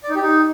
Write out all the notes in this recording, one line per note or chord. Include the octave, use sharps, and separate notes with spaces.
D5
D#4
G4
D#4